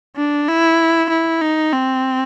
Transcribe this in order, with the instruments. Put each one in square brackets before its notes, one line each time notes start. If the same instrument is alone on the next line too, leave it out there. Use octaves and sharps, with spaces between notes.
[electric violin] D4
E4
E4
D#4
C4